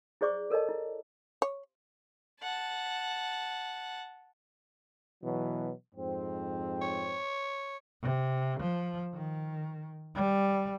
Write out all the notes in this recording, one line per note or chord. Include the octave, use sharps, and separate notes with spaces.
E4 G#4 C5 D5 C#6 D6
A4 A#4 C#5 D#5 A5
E4
C#5
F#5 A5
B2 E3 F#3
F2 G#2 C4
C#5
C3
F3
D#3
G3